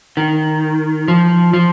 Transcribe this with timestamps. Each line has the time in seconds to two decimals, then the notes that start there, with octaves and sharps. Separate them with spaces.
0.17 D#3
1.08 F3
1.53 F3